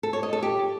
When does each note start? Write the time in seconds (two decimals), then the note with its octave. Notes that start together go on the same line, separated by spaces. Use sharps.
0.03 A4
0.13 C#5
0.23 D#5
0.33 A4
0.43 G4